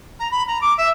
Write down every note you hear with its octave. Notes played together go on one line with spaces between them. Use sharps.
A#5
B5
A#5
D6
E5